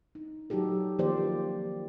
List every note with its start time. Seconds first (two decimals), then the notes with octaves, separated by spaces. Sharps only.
0.15 D#4
0.50 F#3 D#4 F#4 G4 A4
0.99 D#3 F3 A#3 G4 C5 D5